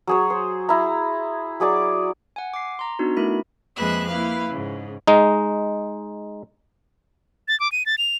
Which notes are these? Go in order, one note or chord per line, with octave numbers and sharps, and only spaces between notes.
F#3 G#4 C#5
C5
E4 A#5
F#3 G#4 D5 D6
F#5 G#5
D6 C7
A#5 C6
B3 D4 D#4 F#4
A3 E4 A#4 B5
F2 G#3 A#3 B4 E5 F#6
A#3 E4 B4 F5
G#2 C#3
G#3 D#4
A6
D6
D#7
A6
F7